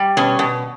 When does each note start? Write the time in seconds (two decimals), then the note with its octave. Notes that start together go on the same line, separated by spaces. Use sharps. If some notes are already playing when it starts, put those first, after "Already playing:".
Already playing: G3
0.17 B2 C#4
0.39 B2